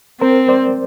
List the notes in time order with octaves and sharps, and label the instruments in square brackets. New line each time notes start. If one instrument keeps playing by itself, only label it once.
[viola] C4 [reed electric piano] A#4 C5
[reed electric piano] C5 D5